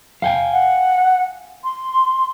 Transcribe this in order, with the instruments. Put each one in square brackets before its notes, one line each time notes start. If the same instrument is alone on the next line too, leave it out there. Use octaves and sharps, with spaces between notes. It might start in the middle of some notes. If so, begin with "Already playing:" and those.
[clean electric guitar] F5 G5 G#5
[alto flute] F#5
C6